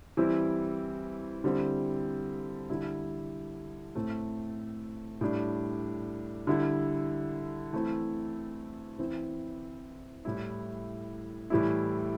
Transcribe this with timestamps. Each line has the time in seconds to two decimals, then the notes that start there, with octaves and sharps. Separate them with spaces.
0.17 E3 G3 C4 E4
1.44 D3 G3 C4 E4
2.70 D3 G3 E4
3.95 A2 A3 C4
5.21 A2 G3 D4
6.47 D3 G3 E4
7.73 E3 A3 C4 E4
8.99 E3 C4 E4
10.25 A2 G3 E4
11.50 A2 E3 G3 E4